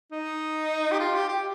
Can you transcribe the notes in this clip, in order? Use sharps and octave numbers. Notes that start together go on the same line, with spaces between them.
D#4
G4
F4
G4
G4